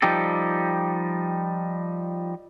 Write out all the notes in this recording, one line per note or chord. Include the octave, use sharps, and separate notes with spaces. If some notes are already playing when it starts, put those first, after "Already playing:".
F3 G3 D#4 G4 A4